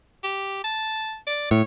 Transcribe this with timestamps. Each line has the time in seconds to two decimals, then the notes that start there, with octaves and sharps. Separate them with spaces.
0.24 G4
0.64 A5
1.27 D5
1.51 A2 C#5